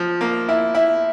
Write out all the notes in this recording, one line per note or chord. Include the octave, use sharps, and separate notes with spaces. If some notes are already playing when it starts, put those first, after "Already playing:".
Already playing: F3
A#3
E4
E4